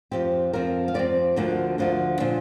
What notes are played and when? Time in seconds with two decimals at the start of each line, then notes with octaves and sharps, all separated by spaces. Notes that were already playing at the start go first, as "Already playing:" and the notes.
0.11 F2 F3 C4 G4
0.53 F2 F3 C4 A#4
0.88 F5
0.94 F2 F3 C4 D5
1.36 D2 D3 F3 A#3 D4
1.78 D2 D3 F3 A#3 D4
2.20 A#2 F3 D4